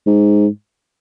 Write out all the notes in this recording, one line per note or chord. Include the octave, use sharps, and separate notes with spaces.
G#2